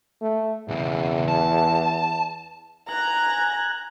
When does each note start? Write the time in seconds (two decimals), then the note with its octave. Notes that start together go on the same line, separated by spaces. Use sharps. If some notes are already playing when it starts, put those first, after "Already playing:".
0.22 A3
0.68 B1 E2 C#3
1.28 A5
2.89 G#5 A#5 F#6